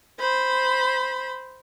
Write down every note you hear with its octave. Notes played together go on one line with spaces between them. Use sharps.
C5 B5